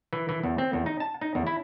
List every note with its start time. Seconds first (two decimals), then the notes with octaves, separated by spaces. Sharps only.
0.13 E3
0.29 E3
0.44 E2
0.58 C4
0.73 E2
0.86 D#4
1.00 A5
1.21 D#4
1.35 E2
1.47 E4